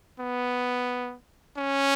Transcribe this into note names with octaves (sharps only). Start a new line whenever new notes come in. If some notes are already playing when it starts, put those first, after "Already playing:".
B3
C#4